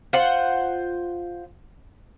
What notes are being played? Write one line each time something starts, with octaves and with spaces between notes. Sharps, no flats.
F4 C5 F#5